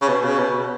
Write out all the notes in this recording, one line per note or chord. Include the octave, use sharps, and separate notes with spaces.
C#3
B2
C#3
B2